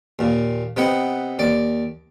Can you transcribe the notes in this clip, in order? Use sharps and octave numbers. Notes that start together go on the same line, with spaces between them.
D#2 A#2
C3 B3 D#4 B4 F#5
D#2 D5